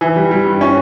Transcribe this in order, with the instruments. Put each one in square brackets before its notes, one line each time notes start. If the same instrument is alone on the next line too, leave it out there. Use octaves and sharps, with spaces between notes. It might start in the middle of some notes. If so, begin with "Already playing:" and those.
[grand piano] E3
G3
G3
G2
C#4